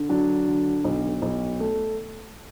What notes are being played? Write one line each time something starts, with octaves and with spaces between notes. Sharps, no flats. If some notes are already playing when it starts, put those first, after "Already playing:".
Already playing: D3
F#3 D4
D3
B1
B1
A3